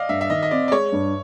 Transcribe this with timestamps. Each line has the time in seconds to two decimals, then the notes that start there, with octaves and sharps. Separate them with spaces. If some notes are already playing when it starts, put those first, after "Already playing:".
Already playing: D5 D#5 F5
0.09 G2 E5
0.21 E5
0.30 D#3 D#5
0.43 D#5
0.51 C4 D5
0.68 D5
0.71 G#3 C#5
0.92 G2